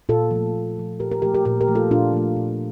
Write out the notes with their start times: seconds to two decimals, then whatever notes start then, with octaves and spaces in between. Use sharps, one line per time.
0.09 A#2 F4 A4
0.31 F3 A3
0.55 A#2
0.77 F3 A3
1.00 A#2 G4 A#4
1.11 G4 A#4
1.22 F3 A3 G4 A#4
1.35 G4 A#4
1.45 A#2 G4 A#4
1.61 G4 A#4
1.68 F3 A3
1.75 F4 A4
1.91 A#2 D4 F4
2.13 F3 A3
2.36 A#2